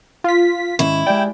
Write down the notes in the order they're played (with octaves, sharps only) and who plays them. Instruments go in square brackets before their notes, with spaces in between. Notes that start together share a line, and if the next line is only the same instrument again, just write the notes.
[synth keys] F4 B6
[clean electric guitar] G#2 D#3 C#4 [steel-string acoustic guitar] E4
[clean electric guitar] G#3 G4 D5 [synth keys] G5